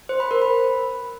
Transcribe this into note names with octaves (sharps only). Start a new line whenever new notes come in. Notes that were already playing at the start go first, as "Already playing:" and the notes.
C5
B5
A#4
B5